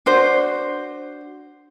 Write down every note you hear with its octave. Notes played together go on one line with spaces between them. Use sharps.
D4 F#4 C5